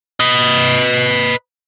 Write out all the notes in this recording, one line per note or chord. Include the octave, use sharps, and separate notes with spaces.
B4 D#5